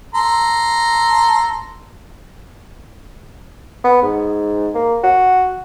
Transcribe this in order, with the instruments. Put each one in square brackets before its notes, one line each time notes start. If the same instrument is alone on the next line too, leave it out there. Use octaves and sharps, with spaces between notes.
[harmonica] A4 A#5 C6
[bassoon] B3
G#2
A#3
F#4